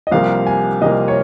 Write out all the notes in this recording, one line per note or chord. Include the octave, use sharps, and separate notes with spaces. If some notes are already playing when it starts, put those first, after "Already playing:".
D#5
C2 C3 F3 A#3 F5
G#5
C2 C3 F3 A#3 D#5
C#5